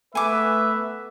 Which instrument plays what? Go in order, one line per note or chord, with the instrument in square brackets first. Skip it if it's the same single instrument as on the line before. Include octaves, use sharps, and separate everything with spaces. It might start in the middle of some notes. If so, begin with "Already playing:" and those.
[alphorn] A3 [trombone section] B3 B4 [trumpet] E5 [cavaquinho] G#5 D6